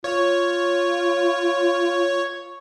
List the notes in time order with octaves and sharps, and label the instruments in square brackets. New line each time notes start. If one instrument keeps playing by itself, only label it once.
[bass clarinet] F4 [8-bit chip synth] C#5